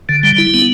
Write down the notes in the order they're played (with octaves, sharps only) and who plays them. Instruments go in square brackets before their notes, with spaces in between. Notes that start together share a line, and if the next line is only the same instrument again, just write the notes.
[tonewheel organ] D3
G3
E4
B3